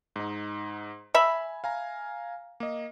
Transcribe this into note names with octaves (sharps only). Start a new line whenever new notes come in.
G#2 D#4
E5 G#5 B5
F5 G#5 A#5
A#3 D#5